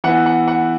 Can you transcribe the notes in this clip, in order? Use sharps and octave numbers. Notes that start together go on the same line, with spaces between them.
E3 B3 E4 F#5
F#5
F#5